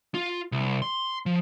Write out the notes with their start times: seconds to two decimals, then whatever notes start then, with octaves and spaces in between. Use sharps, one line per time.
0.14 F4
0.52 C2
0.82 C6
1.26 F3